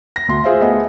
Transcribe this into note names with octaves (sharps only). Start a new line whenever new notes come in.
A#6
D2 C6
F4 G#4 C5 E5 F5
A3 B3 G#4 D#5